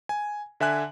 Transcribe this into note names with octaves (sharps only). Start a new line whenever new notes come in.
G#5
D3 E5 G#5 F#6